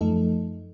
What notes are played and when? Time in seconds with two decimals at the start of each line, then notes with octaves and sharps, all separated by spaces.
0.01 F#2 F3 A3 D#4 A4